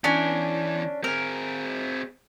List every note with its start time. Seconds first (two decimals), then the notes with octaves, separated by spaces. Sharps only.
0.04 E2 E3 C#4 D4
1.04 C4 G#4 A#4